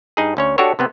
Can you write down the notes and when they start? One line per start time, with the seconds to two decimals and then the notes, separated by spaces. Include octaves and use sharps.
0.17 G2 D#4 G#4
0.37 D2 C#4 C#5
0.58 D4 F#4 G4 A4 C#5
0.79 C3 B3 C4